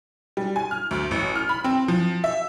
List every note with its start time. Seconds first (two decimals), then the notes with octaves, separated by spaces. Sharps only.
0.37 G3
0.56 G#5
0.71 F6
0.91 D2
1.11 A1
1.35 F6
1.49 B5
1.64 C4
1.88 F3
2.24 E5